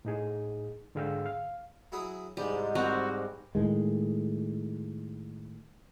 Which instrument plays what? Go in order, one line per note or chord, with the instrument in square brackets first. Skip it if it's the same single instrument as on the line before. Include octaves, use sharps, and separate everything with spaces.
[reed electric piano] A2 D#4 G#4
G#2 D3 G#4 F5 G5 E6
F5
[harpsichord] F#3 E4 G#4
[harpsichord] C2 G#3 [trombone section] G#2 [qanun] G3
[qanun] G3 C4 A#4 [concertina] F#4
[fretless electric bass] A2 D#3 G#3